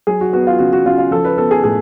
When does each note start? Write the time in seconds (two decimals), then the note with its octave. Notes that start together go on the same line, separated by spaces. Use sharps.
0.07 F#3 G#4
0.21 F#4
0.33 B3 F#4
0.47 F4
0.59 C#3 F#4
0.73 F#4
0.86 C#3 F4
0.98 F4
1.11 F3 A4
1.25 B4
1.37 B3 A4
1.51 G#4
1.64 A2 G#4